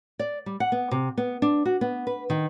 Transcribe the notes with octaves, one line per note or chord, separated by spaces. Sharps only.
D5
G3
F#5
B3
C3
B3
D4
F#4
B3
B4
D#3